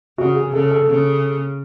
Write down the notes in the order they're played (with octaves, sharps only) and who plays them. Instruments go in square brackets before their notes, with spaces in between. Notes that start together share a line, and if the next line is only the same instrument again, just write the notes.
[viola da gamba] C#3 [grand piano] F#4
[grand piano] G#4
[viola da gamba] C#3 [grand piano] A4
[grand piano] A4
[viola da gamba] C#3